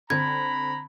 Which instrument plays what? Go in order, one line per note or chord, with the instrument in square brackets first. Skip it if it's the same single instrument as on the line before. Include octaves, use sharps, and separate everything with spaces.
[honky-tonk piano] D3 C4 [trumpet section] A#5 B5 [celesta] G#6